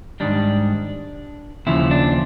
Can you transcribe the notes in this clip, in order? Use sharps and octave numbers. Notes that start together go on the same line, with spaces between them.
G#2 D#3 G3 D4
D#2 C#3 F3 E4
D4